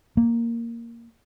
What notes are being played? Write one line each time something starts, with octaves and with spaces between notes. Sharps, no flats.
A#3